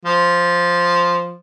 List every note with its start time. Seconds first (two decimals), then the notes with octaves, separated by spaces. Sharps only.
0.05 F3